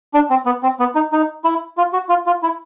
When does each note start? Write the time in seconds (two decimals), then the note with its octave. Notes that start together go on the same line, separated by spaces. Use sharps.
0.14 D4
0.30 C4
0.46 B3
0.63 C4
0.80 B3
0.95 D#4
1.12 D#4
1.44 E4
1.77 F4
1.93 F#4
2.09 F4
2.26 F4
2.43 E4